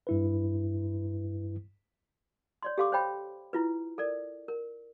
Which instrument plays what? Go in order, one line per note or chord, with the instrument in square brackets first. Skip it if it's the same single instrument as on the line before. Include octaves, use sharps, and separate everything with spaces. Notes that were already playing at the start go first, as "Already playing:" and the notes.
[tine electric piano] G2 E4 B4
[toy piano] C#5 D5 C6
G4 A4 F5 C6 D6
C5 C#5 G5 B5
E4 F4 B4
A4 A#4 D5
A#4